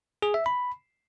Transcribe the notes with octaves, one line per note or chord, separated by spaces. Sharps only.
G#4
E5
B5